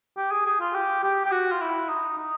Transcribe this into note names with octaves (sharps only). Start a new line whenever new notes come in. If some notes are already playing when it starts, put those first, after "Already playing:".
G4
G#4
G#4
F4
G4
G4
G4
F#4
F4
E4
D#4
D#4